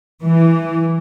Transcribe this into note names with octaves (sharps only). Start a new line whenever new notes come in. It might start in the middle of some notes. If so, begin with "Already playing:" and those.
E3